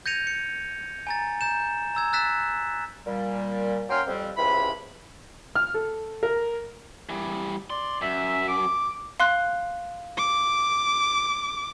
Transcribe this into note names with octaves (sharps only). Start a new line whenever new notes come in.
G6 G#6 A#6 C#7 D#7 F7
C#7
G#5 A#5 A6
A#5 G6 E7
A#5 E6 G#6
E6 F#6 A6 B6 E7
A#2 G3
F#3 A#3 C#4 G5 C6 F6
F2 G3 C4
C#2 C3 E3 B5
F6
A4
A#4
E3 G3
D5 C6
F#2 E5
D6
F5 C6 F#6
D6